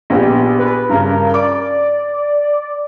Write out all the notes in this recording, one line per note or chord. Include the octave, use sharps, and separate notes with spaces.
A#1 B3 G4
B4
G2 C#3 A#4
D5 D6